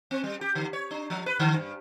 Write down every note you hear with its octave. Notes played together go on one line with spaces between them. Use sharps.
C4
G3
G4
D3
C#5
D4
F3
B4
D3
G2